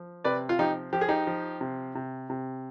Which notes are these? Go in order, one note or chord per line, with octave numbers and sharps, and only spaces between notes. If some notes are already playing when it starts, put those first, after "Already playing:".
Already playing: F3
C3 B4 D5
F4
F3 D#4 G4
F3 G4
G#4
D#4 G4
F3
C3
C3
C3